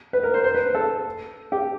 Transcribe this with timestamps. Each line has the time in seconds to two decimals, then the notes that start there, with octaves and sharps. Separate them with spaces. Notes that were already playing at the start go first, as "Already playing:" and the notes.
0.13 B4
0.23 A#4
0.34 C5
0.44 C5
0.54 B4
0.75 A4
1.52 G4